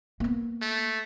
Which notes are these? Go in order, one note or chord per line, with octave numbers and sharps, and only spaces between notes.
A#3 B3
A3